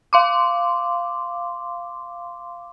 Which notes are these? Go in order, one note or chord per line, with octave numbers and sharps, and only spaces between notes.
F5 C6 D6